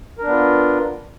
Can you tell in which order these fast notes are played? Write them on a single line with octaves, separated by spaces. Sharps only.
A#4 D4 B3 F4